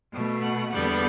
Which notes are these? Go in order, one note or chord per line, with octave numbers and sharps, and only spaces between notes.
B2 A3
F#5
E2 D3 G3 B3 F#5